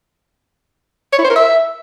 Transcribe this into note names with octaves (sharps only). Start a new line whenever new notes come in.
C#5
E4
C5
A#4
E5